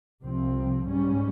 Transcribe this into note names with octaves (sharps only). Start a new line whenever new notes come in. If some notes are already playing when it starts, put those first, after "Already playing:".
C2 C3 F3 C4
G#2 G3 C#4